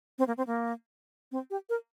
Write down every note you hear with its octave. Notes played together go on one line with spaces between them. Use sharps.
C4
A#3
C4
A#3
C4
G4
A#4